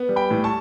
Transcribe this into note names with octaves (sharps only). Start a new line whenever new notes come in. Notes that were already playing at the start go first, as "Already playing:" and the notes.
Already playing: B3
G3
G5 B5
A2
A5 C#6